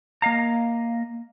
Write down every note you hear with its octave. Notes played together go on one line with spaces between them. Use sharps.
A#3 D#5 F5 A#5